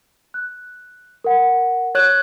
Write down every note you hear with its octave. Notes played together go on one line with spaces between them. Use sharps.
F#6
A#4 F#5
C#5 F#6